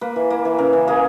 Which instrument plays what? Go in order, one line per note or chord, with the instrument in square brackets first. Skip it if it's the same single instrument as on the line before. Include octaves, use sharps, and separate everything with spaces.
[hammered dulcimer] A#3 B4
E3
A#3
E3
C#3 A#4
E3
A#3 G#4